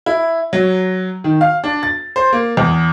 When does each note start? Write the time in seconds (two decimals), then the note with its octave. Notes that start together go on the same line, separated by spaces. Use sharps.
0.06 E4
0.53 F#3
1.24 D#3
1.41 F5
1.64 D4
1.83 A6
2.16 C5
2.33 A#3
2.57 E2